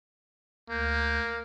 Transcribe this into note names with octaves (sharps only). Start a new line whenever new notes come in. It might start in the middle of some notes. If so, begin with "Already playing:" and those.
D2 A#3 G6